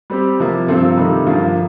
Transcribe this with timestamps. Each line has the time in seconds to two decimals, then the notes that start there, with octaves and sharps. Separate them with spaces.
0.10 G3 C4 G4
0.40 C3 F3 A#3 F4
0.68 G2 F3 C4 F4 A4
0.97 C3 D#3 G3 A#3 D#4
1.26 G2 D3 F3 A#3 F4